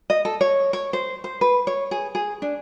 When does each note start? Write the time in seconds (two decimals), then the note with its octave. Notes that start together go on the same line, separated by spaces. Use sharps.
0.10 D#5
0.25 A4
0.41 C#5
0.73 C#5
0.93 C5
1.24 C5
1.41 B4
1.67 C#5
1.91 G#4
2.15 G#4
2.42 D4